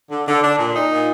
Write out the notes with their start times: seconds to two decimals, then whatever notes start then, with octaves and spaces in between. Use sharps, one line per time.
0.11 D3
0.27 D3
0.43 D4
0.58 A#2
0.74 D#4
0.91 A#2